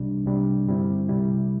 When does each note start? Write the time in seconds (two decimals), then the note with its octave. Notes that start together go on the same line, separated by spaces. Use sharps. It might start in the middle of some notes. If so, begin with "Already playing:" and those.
Already playing: C2 C3 G3 D4
0.25 C2 C3 G3 D4
0.66 G2 D3 G3 C4 E4
1.08 C2 C3 G3 E4